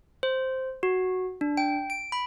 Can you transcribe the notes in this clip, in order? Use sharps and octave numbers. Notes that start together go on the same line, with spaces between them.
C5
F#4
D4
G5
D7
B5